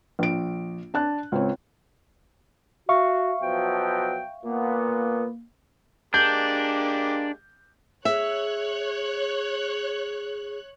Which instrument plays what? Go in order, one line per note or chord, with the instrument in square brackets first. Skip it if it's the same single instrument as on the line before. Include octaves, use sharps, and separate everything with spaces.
[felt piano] A#1 D7
D4 A5 F#6
C#2 C4 C#5
[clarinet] F#4 [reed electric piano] E5 F5 C#6
[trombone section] B2 F3 F#3 [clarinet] G5
[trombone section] A#2 B3 [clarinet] A#3
[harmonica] G#3 A#3 G4 [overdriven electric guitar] D4 [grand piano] G6
[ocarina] G#4 [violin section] C#5 F#6 [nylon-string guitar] E5